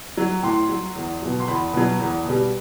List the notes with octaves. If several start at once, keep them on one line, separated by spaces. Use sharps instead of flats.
F#3
A2 C6
F#3
E2
B2 F#3
C6
E2 B5
B2 F#3
E2
B2 G3